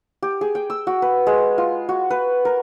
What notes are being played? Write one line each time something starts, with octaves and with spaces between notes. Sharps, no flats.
G4
G#4
G5
E6
F#4
B4
G#3
F4
F#4
B4
A#4